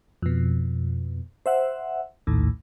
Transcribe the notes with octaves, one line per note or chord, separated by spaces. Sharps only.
F2 B2
C5 E5 F#5
A#1 D#2 A2